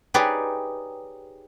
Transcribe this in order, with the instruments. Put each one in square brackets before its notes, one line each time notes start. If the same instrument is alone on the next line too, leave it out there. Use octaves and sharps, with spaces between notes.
[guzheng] D#4 G4 G#4 B4 C#5 D5